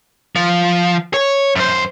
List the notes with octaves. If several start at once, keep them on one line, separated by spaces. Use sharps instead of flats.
F3
C#5
F#2 C5